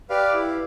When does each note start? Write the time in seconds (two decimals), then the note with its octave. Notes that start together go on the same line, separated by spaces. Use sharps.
0.10 G4 B4 D5 F5
0.33 E4